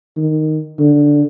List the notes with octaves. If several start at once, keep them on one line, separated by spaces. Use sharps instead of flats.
D#3
D3